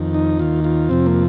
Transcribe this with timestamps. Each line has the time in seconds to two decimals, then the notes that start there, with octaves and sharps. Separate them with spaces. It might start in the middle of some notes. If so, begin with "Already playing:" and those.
Already playing: F2 D#3
0.14 D#4
0.39 D#2 D#3 F4
0.64 F4
0.89 F2 C3 F3 C4
1.06 A#3